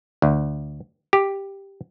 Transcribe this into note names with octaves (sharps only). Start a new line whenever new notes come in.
D2
G4